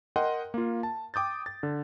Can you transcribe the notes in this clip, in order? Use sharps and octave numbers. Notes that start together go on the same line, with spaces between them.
A#4 D#5 F#5 G5 C6
A#3 F4
A5
G5 D6 D#6 G6 A6
A6
D3